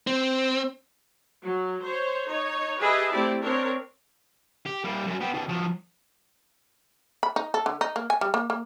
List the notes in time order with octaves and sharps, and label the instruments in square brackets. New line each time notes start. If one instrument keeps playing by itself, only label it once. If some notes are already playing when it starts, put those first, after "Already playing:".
[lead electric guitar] C4
[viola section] F#3
C5 C#5
D#4 C#5
G4 G#4 B4 D#5 E5 A5
A3 C4 E4 G4 D5
C4 D4 A#4 C#5
[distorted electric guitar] G4
G3 A#3
F#2 F#3
B3 G4
B2 D#3
F3 F#3
[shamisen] B5
D#4
A4
D3
D#4
A#3
G#5
G3
A#3
A#3